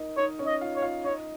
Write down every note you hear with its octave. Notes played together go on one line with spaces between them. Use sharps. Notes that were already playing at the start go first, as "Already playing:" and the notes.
Already playing: D#4 A#4 D#5
D#4 C#5 D#5
C#4 C#5
D#5
F4 F5
C#5
F4 F5
D#4 C#5 D#5